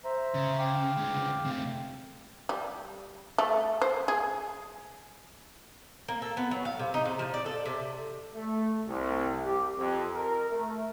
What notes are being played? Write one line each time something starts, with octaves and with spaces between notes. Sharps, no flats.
C5 E5 A#5
C#3
F5 G5 D6
D3 G#3
C3 A3
G3
A3
C5
G#4
A#3
A4
B3
F#3
F5
C3
D#4
C3
F3
D5
A4
C3
A3
C2
G4
F2
A#4
A3